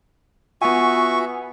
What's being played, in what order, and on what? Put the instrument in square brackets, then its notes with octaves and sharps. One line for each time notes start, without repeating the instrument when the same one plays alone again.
[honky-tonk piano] B3 G#5 [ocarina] F4 [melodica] F#4 E5 [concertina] C#6